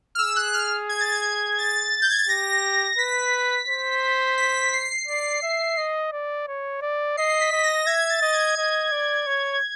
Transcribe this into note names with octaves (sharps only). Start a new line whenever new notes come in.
F6
G#4 E6
F#6
F6
G#6
A6
G#6
A6
G6
G#6
A6
G4 A#6
B4 B6
C5
B6
C7
D5 C7
E5
D#5
D5
C#5
D5
D#5 C7
B6
D#5
A#6
E5 G#6
A6
D#5
G#6
D#5
D5
C#5